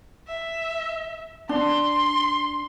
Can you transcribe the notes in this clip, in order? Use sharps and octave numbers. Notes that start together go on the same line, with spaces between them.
E5
D4 C6